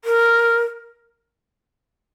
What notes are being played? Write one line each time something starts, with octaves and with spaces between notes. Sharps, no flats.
A#4